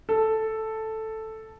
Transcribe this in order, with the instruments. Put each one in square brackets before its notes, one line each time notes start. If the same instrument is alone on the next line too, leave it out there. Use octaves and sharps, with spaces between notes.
[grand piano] A4